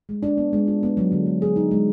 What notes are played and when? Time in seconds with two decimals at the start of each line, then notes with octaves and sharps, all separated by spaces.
0.09 G#3
0.23 D4
0.37 B3
0.53 G#3
0.68 F4
0.83 B3
0.97 F#3
1.12 D3
1.26 G#3
1.42 G#4
1.56 D#4
1.71 G#3